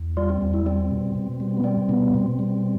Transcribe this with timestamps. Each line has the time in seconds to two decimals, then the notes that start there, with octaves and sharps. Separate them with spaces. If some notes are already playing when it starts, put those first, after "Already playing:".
Already playing: E2
0.17 G3 F4
0.29 C4
0.41 E2 C4
0.54 E4
0.66 G3 C4
0.91 B2
1.15 B2
1.40 G3
1.57 B3
1.64 G3 C4
1.89 B2 B3
2.14 B2 C4
2.39 G3